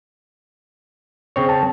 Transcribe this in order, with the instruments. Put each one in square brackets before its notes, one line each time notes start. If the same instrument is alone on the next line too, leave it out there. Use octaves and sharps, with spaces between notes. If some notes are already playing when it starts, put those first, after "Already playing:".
[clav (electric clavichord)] C#3 C4 C#5
[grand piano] A5